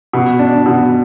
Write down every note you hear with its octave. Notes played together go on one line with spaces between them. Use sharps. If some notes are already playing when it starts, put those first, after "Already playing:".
B2
D4
B2